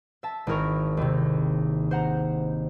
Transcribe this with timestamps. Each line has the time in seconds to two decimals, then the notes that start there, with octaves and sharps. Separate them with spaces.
0.23 E5 A5
0.47 G#1 E4 A#4 C#6
0.97 D#2 C3
1.91 C5 F#5 A#5